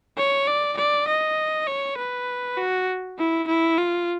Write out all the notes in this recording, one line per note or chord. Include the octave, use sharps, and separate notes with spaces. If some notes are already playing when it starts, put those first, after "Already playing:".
C#5
D5
D5
D#5
C#5
B4
F#4
E4
E4
F4